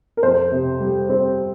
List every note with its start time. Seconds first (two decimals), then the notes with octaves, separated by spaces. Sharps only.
0.17 A#4
0.23 F2 C5
0.52 C3
0.80 G3
1.09 C4